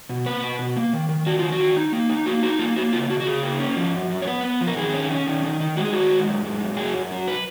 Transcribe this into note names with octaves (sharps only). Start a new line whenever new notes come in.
B2
A#3 B4
B2
B2
A#3
D#3
D#3
D#3 F#4
D#3 F4
F#4
D#3
D#4
A#3
D#4
A#3 F#4
D#4 F#4
A#3 F4
A#3 F#4
C#3 F4
C#3 F#4
F#4
C#3 G#4
A#3
C#4
F3
F#2
F#2
C#5
B3 B4
B3
F3
A#4
D#3 G#4
C#4
C#4
D#3
D#3
D#3
G#3 F#4
G#4
D#3 F#4
G#3
F#2
G#3
F#2
F#3 G#4
F#2
F#3
B4